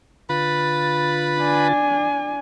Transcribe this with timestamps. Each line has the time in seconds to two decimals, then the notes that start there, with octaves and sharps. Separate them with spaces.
0.29 D3 F4 B4 B5 A6
1.40 D4 G#5